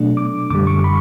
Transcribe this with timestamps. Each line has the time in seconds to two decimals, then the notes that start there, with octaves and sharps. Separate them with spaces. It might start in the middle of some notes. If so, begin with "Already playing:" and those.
Already playing: B2 F#3 A3 D4
0.17 D6
0.50 F#2 D3 G3 D6
0.67 C#6
0.84 B5